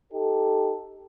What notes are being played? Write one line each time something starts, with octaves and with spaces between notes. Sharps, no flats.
D#4 G4 A4